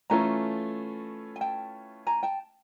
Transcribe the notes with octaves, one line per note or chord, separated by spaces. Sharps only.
E3 A3 C#4 F4 A4 G#5 A#5
G#5
G5 A5
G#5 A#5
G5 A5